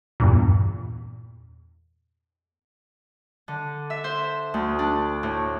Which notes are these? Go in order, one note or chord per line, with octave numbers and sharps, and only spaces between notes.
E2 G2 A#2
D3
E5
C5
D2
D4
A2